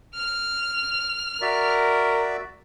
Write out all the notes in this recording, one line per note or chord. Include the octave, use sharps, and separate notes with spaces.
F6
F#4 A#4 D5 E5